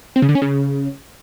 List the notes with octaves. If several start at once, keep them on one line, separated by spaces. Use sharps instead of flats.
C4
C#3
D3
C#4
C#3